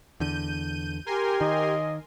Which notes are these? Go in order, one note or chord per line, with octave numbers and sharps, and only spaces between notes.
E2 D3 G6 D#7
G4 A#4 G#5 C6
D#3 D#5